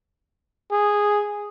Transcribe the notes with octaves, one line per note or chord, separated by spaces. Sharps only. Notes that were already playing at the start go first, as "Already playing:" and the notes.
G#4